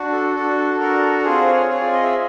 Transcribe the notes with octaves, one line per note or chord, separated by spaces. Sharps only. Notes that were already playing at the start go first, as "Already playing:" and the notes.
Already playing: D4 F#4
A4
D4 F#4 A4
D4 F#4 A4 A#4
C4 F4 G#4 C5
C#5
C4 F4 G#4 C#5
D5
D#5
E5